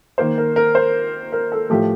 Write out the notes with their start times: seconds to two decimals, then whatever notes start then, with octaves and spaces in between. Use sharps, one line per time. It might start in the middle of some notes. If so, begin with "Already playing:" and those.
0.18 D#3 A#3 C5
0.38 A#4
0.56 A#4
0.75 C5
1.32 A#4
1.52 A4
1.70 A2 F3 A3 G4